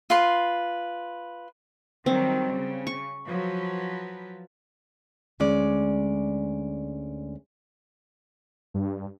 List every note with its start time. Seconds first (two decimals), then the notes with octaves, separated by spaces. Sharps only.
0.10 F4 B4 C6
2.06 D#3 F#3 G3 C4
2.55 C#3
2.87 C#6
3.26 F3 F#3 B4
5.40 D2 G#3 C#4 D5
8.74 G2